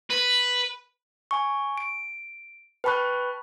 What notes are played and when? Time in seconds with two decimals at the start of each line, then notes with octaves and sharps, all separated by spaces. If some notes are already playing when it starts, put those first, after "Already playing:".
0.10 B4
1.31 G#5 C#6
1.78 D7
2.84 B4 G5 A5 B5 C#6 F#6